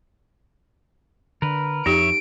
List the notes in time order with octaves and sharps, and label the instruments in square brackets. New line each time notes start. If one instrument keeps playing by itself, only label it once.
[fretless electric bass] D3 [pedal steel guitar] A#4 B4
[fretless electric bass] F2 [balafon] D#4 G4 [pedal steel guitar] C#5 E5 [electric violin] D7